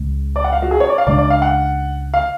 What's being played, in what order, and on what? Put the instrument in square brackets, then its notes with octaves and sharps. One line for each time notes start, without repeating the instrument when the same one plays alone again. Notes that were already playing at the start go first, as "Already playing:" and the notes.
Already playing: [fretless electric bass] C#2 C#3 G#3
[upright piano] D5
F#5
F5
F#4
G#4
C#5
D5
F5
[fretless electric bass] C#2 C#3 G#3 D4 [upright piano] D5
[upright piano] D5
F5
F#5
F5